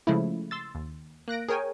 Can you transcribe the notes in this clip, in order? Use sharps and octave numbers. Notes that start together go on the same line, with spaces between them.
C#3 F3 G#3 A3 E4
C6 E6 A6
D#2
A#3 F#6 A#6 D7
G#4 A#4 C#5 G5 G#5